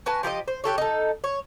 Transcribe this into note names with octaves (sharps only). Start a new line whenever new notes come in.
F#4 B4 G#5 A5
F3 G4 A#4 D#5
C5
F#4 G4 A4 C#5
D#4 A4
C#5